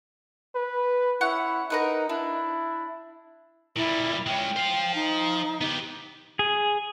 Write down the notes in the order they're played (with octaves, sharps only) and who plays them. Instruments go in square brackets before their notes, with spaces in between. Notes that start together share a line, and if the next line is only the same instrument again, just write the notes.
[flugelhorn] B4
[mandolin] C#4 F#5 [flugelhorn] E4
[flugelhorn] D#4 [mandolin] A#4 B4 F#5
[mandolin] D4 [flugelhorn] E4
[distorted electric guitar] A#2 G3 [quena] E4
[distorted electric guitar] G#3 C#4 [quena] G5
[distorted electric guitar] C5 F5
[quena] D#4
[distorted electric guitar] B3 G4
[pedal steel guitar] G#4